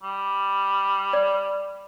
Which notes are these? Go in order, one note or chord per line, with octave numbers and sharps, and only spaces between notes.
G3
D5